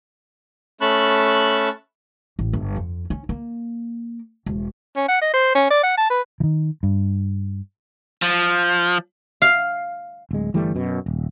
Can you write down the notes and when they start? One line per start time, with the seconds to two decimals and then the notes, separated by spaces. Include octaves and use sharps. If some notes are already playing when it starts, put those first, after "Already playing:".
0.81 A3 C#4 A5 B5 C#6 F#6
2.39 A1
2.53 G1
2.76 F2
3.10 C#4
3.29 A#3
4.46 E1
4.96 C#4
5.09 F#5
5.22 D#5
5.34 C5
5.55 C#4
5.70 D5
5.83 F#5
5.97 A5
6.10 B4
6.40 D#3 E3
6.83 G2
8.22 F3
9.42 F5
10.31 D1 G#3
10.54 G1 E3 G3 A3
10.75 F#2 B2
11.06 D#1